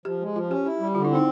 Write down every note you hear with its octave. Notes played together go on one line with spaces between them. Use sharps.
F3 G4
G#3
F3 F4
C#4 G4
E4 G4
G3
D3 F4
E4
C4 D#4